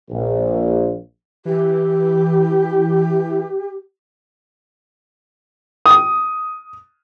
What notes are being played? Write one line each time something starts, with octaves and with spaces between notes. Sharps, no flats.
A#1
E3 G4
D#6